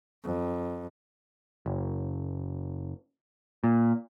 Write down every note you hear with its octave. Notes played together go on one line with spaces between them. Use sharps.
F2
F#1
A#2